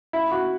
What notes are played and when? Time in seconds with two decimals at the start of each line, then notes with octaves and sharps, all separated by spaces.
0.13 E4
0.31 F#4